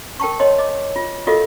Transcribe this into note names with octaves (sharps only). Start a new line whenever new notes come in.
A#4 G5 A5 C#6
C#5 D#5 C6
D#5 D6
F4
F4 F#4 A4 A#4 D#5 F5